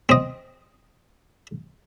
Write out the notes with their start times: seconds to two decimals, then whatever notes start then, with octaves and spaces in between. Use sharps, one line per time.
0.09 C4 D#5